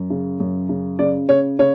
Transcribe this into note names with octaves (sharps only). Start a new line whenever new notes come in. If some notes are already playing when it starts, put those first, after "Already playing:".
Already playing: F#2
C#3
F#2
C#3
C#3 D5
C#3 C#5
C#3 C#5